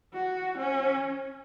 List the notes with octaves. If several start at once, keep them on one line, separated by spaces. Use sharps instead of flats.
F#4
C#4